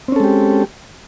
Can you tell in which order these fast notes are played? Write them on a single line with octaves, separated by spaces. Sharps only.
C4 C#4 A4 G#3 G4